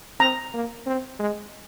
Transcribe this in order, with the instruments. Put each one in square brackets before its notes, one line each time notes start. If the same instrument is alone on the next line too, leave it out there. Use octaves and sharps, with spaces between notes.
[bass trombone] C4 [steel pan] A#5
[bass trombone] A#3
C4
G#3